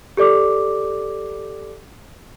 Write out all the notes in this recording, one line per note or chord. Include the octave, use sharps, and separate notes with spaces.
G4 A4 D5 D6